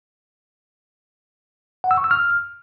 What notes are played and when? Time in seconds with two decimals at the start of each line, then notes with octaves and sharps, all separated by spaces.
1.84 F#5
1.91 E6
1.97 C#6
2.04 E6
2.11 F6